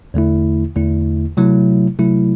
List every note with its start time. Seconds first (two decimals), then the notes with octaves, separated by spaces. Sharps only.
0.14 E2 D3 A3 E4
0.76 E2 D3 A3 E4
1.37 C3 F#3 A3 E4
1.99 C3 F#3 A3 E4